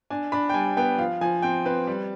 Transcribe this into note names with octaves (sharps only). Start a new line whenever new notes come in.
D4 G#5
D4 B5
G5
G3 G#5
B3 G5
F3 F5
F3 G#5
C4 G5
C4 B4
G3